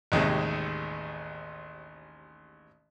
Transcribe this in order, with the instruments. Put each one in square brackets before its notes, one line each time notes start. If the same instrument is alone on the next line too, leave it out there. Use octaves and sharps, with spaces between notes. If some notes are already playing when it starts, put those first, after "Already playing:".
[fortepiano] A1 D#2 C3 G#3